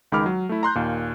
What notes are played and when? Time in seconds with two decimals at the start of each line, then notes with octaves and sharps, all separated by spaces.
0.12 C#2 D#3 G#3 B5 D6 F6
0.26 F#3
0.49 A3 E4
0.63 A#5 C6 F#6 G6
0.75 D#2 A#2